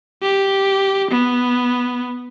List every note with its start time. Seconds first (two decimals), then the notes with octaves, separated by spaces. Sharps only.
0.23 G4
1.11 B3